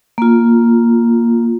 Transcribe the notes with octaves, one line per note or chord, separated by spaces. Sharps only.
A#3 F4